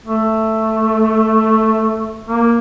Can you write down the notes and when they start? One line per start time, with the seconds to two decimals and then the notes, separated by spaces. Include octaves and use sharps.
0.05 A3
2.29 A#3